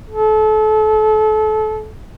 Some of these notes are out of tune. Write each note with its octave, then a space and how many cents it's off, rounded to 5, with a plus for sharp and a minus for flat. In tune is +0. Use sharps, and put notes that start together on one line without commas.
A4 -30